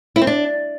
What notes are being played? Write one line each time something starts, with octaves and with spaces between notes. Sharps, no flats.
E4
C4
D4